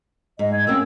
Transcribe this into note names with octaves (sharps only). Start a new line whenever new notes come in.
G#2 D#5
G#6
F#3 A#3 C4 C#4 E6